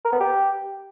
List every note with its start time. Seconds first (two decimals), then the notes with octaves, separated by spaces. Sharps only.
0.05 A#4
0.12 B3
0.20 G4